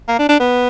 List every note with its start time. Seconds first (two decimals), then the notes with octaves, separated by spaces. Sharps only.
0.08 A#3
0.19 D4
0.29 D4
0.40 B3